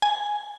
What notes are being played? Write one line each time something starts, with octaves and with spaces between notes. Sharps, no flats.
G#5